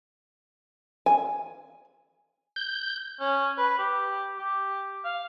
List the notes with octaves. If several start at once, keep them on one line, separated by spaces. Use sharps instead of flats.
G#5
G6
C#4
B4
G4
G4
F5